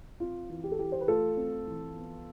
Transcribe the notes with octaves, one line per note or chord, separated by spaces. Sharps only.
C4 F4
E3
G4
A4
E3 G4
C5
B4
A3 F4 A4
C4
E3
B3